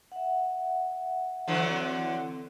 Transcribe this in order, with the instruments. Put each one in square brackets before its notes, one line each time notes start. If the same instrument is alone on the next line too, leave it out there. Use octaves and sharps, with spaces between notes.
[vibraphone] E5 F#5
[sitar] D3 E3 F#3
[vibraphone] C4